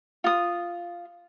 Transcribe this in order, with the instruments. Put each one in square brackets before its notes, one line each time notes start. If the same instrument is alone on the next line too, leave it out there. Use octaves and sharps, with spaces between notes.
[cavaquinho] F4 D#6